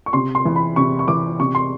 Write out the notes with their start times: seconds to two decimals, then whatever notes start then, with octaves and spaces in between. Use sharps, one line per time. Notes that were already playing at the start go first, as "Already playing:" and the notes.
0.06 C#6
0.13 C3 C6
0.35 C6
0.45 E3
0.56 B5
0.76 C3 C#6
0.99 C#6
1.08 E3 D6
1.40 C3 C#6
1.55 C6